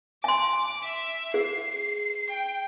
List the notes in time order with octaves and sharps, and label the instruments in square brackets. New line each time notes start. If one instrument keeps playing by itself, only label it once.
[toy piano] G#5 C6 [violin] D6
[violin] E5
[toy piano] G#4 [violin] C7
[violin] G5